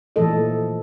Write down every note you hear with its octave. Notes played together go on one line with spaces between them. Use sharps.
A#2 E3 F3 A3 A4 D#5